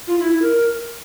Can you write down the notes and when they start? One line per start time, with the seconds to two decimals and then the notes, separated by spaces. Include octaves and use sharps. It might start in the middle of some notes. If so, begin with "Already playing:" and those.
0.08 F4
0.19 E4
0.30 E4
0.42 A#4